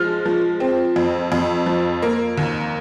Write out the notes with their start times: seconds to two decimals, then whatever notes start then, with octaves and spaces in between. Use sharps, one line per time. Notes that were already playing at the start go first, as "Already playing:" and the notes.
Already playing: F3 G#3 F6
0.26 F3
0.60 C4
0.96 F2
1.32 F2
1.66 F3
2.02 A#3
2.38 D#2